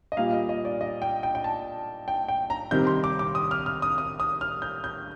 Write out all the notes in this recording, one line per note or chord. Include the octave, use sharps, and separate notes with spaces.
D#5
A#2 G3 A#3 F5
D#5
D#5
D5
D#5
G5
G5
G5
A5
G5
G5
A#5
C3 D#3 G3 C4 G6
C6
D6
D6
D#6
F6
F6
D#6
D#6
D#6
F6
G6
G6